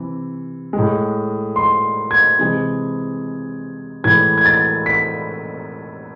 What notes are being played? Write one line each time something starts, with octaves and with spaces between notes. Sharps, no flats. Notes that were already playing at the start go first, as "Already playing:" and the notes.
Already playing: C3 E3
G#3
A2
C6
G#6
C3 E3 G#3
A2 E3 G#3 G#6
G#6
A6
B6